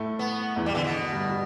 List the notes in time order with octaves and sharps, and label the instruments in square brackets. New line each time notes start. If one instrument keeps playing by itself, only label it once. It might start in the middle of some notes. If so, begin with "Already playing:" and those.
Already playing: [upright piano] A2 A3
[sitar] B3
[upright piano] E2 E3
[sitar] G3
[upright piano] D3 [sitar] E3
[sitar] B2
[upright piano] D3
G2 G3
G3